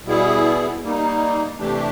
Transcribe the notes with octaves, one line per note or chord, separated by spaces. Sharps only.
B2 G3 B3 E4 G#4
G3 A#3 D#4
C3 E3 A3 D4 G4